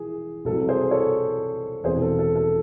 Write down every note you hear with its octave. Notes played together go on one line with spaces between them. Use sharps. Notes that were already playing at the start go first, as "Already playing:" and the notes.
Already playing: E3 G#4
C2 C3 F#3 A4
G#4 C5
A4 C#5
E1 E2 C3 G#4 C5
A4
A4
A4